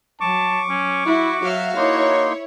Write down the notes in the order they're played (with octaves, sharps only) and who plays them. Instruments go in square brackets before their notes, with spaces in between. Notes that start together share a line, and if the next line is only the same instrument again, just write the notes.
[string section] F#3 [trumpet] A5 [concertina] C#6 D6
[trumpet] C#4
[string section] E4 [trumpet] F#4
[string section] F#3 E5 F5
[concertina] A#3 D#4 C6 [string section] E4 C#5